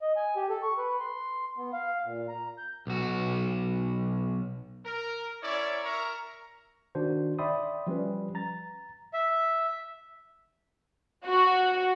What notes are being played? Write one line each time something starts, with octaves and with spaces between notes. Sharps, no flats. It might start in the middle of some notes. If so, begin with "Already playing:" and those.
D#5
G#5
G4
A4
C#6
B4
C6
B3
F5
A#2
A#5
G6
B1 F#4
A#4
C#4 E4 A#4 C#5 D5
A#4 E5 A#5 C#6
D#3 D4 F#4 C5
D5 E5 G5 B5 C6 D#6
F3 G3 C#4 B4
A#5 A6
E5
F#4